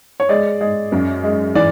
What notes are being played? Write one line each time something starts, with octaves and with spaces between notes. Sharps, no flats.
C#5
G#3 D5
G#3
F#2
G#3
E3 D5